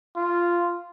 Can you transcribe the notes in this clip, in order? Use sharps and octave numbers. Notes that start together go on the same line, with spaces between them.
F4